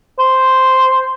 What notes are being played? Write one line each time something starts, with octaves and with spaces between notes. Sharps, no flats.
C5